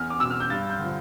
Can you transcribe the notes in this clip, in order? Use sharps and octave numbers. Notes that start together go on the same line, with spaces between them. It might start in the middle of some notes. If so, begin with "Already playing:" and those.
Already playing: E2 F6
D6
B2 E6
F6
G6
G2 A6
G6
D3 F3